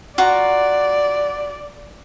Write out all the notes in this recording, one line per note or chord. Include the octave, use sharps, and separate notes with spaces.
F4 F#4 D5 A#5